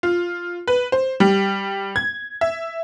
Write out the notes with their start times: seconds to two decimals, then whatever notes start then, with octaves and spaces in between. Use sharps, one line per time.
0.03 F4
0.67 B4
0.92 C5
1.20 G3
1.96 G#6
2.41 E5